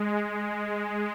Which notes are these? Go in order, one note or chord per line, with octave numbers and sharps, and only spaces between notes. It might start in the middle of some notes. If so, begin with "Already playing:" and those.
Already playing: G#3
G#3